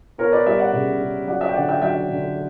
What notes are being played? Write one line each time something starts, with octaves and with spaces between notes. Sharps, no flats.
B3 A#4 C#5
B4 D5
G3 C#5 E5
D5 F#5
C#3
C#3
F#3 D5 F#5
C#5 E5
G5
D3 D5 F#5
E5 G5
F#3 E5 G5
D3